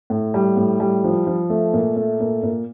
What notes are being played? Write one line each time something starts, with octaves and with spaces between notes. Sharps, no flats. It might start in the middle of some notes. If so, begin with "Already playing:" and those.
A2
G3
A2
G3
F3
F3
A3
A#2
A3
A#2
A#2